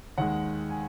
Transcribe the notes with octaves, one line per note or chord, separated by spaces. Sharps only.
D#2 D#3 G#3 F#5
G#5